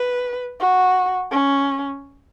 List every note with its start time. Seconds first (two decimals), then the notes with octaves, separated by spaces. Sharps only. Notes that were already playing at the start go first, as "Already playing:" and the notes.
Already playing: B4
0.60 F#4
1.32 C#4